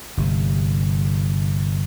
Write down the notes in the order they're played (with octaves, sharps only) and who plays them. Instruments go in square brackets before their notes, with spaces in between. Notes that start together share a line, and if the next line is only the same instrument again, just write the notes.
[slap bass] G1 C3